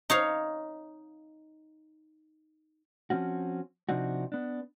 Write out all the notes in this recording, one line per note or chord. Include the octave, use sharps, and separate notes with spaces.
D#4 C#5 F5
F3 C4 C#4 F#4
C3 F3 C4 D4 D#4 F#4
B3 D4